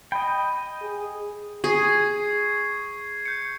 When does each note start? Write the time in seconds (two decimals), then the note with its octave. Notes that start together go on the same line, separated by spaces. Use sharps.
0.12 D#5 G5 B5
0.82 G#4
1.64 G#4 C#6 G#6 C7
3.26 G6 C#7